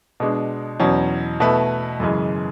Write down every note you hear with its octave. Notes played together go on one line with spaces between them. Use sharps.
B2 G#3 D4
E2 B2 F#3 C#4
B2 A3 E4 B4
F#2 C#3 E3 G#3